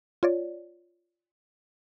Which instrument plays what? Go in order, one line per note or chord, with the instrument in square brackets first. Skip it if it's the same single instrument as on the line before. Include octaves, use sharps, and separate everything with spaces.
[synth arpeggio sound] F4 C#5 D5